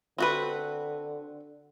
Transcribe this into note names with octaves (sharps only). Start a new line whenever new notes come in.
D3 C4 F#4 B4